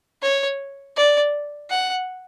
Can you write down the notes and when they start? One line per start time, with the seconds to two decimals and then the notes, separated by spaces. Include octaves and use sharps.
0.22 C#5
0.96 D5
1.70 F#5